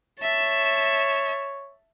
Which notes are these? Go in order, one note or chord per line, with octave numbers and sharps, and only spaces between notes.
C#5 E5 A5